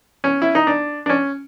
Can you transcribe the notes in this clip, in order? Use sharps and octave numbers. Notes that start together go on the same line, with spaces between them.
C#4
E4
D#4
D4
D4
C#4